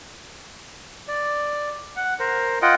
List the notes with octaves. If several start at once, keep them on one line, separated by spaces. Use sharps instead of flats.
D5
F#5
A#4 C5
F4 D#5 F#5 G5